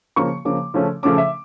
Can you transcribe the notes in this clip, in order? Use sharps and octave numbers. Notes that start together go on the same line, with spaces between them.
C#3 F3 A#3 C#6
C#3 F3 A#3 D6
C#3 F3 A3 C#4
C#3 F3 A3 C#4 D6
E5